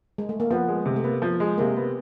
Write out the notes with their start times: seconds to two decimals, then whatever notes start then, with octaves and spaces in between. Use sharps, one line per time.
0.18 G#3
0.29 A3
0.40 A#3
0.50 F3 B3
0.68 G#3
0.86 C3
0.96 A3
1.04 A#3 B3
1.22 F3
1.40 G#3
1.58 C3 A#3
1.77 B3